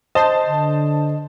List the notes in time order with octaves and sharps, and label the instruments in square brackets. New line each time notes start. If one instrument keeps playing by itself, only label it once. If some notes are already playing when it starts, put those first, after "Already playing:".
[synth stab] C5 [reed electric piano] D#5 [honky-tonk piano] A5
[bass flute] D3